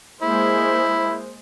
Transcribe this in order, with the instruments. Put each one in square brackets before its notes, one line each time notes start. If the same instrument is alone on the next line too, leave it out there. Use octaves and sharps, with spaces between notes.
[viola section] G#3 A#3 C5 [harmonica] E4